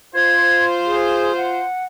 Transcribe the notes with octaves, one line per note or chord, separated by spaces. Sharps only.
F4 C5 G#6
G#4
F#5